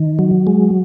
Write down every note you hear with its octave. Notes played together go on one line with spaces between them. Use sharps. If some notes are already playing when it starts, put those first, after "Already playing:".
Already playing: D#3
F#3
G#3